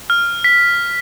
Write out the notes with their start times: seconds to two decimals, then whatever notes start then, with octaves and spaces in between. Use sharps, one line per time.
0.10 F6
0.44 B6